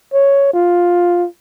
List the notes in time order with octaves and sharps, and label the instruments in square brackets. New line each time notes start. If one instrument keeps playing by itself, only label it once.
[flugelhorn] C#5
F4